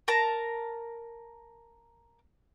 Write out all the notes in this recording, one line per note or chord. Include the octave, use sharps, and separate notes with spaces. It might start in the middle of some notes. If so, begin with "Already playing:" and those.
A#4 A5 A#5